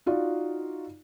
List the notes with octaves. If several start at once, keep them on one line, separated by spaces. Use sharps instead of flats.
D#4 F4 F#4 D5